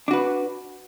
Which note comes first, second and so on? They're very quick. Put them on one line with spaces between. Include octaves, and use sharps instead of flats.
D4 F#4 B4